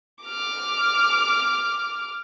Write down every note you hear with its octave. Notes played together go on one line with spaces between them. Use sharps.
D6 F6